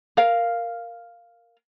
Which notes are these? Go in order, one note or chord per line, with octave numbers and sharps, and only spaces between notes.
A#4 F5